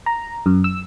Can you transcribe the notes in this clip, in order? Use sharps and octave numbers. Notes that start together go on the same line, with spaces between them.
A#5
F#2
E6